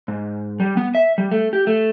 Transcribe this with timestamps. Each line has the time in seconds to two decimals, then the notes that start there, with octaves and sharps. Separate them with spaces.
0.08 G#2
0.60 G3
0.77 B3
0.95 E5
1.18 G3
1.32 A3
1.53 G4
1.67 A3